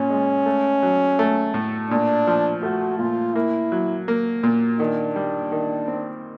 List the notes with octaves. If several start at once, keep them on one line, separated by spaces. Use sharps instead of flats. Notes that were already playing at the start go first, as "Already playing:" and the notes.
Already playing: A#2 C#4
G#3
A3
F#3
A3
A2
A#2 D4
F3
A3 F#4
A#2 F4
A#3 E4
F#3
A#3
A#2
D#3 D4
G3
D#3
C4